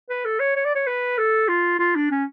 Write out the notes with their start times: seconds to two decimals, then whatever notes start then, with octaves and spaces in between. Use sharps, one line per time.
0.10 B4
0.25 A4
0.39 C#5
0.56 C#5
0.65 D5
0.75 C#5
0.86 B4
1.18 A4
1.48 F4
1.79 F4
1.95 D4
2.11 C#4